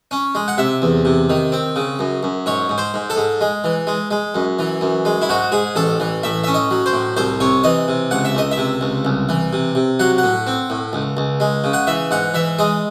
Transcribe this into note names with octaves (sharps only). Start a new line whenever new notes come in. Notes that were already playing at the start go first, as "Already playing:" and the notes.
C#4
G#3
F#5
C3 E5
E2
C3
D#3
C4
C#3
F#2
F#2
G#2 C#5
G#2
C5
G#2
A4
G#2
G#3
E3
G#3
G#3
F#2
E3
F#2
G#3
E4
G#2 F#4
G#2 G#4
A1 A4
E3
A2 E5
C#4 E5
D#5
F#3
C5
A2
C2 C5
C3 C#5
E3 D#5
C3
C#2 F#5
E5
C#2 D#5
E5
C3
C#2
C2
E3
C3
C3
F#3 F#5
F#5
A2
C4
A2
C#2
C#2
G#3
C#3
F#5
E3 E5
G#2 F#5
E3 E5
G#3 D#5